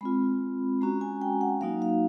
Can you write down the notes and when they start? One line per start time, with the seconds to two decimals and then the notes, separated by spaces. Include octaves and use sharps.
0.01 G#3 C4 F4 B5
0.81 G#3 C#4 F#4 A#5
1.01 G#5
1.21 G5
1.41 F#5
1.61 F#3 A#3 D#4 F#4 F5
1.82 F5